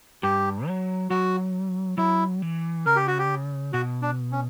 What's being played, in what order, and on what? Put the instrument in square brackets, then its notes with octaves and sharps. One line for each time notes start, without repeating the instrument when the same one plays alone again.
[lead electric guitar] G2 [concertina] G4
[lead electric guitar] F#3
[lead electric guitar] F#3 [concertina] F#4
[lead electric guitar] F#3 [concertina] E4
[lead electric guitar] E3
[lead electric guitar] C#3 [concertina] A#4
[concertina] G4
F#4
G4
[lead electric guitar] B2 [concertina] F#4
[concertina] D4
C#4